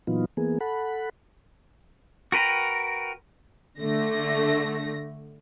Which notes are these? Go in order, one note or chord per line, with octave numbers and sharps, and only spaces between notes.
A#2 E3 F#3 B3 D#4 F4
E3 A#3 B3 G#4
A4 F#5 B5
F#4 A#4 B4 G5 A#5
D3 A3 A#6